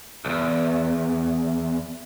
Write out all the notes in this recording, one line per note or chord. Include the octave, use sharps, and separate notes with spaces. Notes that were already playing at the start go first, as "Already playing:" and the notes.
B1 E2